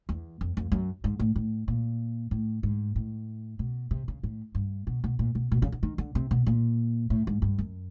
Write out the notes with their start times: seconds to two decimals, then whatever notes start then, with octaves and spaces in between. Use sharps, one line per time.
0.09 E2
0.41 F2
0.57 F2
0.72 F#2
1.04 G#2
1.20 A2
1.36 A2
1.68 A#2
2.31 A2
2.63 G#2
2.96 A2
3.59 B2
3.91 C3
4.08 C#3
4.23 A2
4.55 G2
4.87 B2
5.04 B2
5.19 A#2
5.35 B2
5.52 B2
5.62 C#3
5.72 D3
5.83 D#3
5.98 D3
6.15 C3
6.31 B2
6.47 A#2
7.10 A2
7.27 G#2
7.42 G2
7.58 F#2